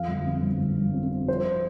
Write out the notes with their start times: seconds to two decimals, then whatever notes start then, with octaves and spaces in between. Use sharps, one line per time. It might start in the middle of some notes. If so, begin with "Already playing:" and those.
Already playing: F2 F3 F5
0.08 G1
0.26 C4
0.43 G1
0.61 G1
0.78 G1
0.94 C4
1.11 C4
1.28 F3 C5